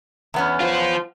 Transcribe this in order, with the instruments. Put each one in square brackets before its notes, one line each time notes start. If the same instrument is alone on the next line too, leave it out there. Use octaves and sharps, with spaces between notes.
[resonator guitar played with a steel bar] E2 B3 C#4
[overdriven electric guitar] F4 C5